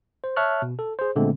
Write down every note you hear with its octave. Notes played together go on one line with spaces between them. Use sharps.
C5
C#5 E5 A5 C#6 F6 F#6
B2
A4
G#4 C5
A#2 D3 G#3 A3 B3 C4